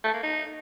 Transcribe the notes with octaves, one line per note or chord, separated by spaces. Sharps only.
A3
A#3
D#4